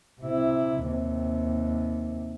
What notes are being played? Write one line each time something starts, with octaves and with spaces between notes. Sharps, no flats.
C3 E4
D#2 C3